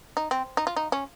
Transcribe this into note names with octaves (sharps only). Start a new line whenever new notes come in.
D#4
C4
D#4
F4
D#4
C#4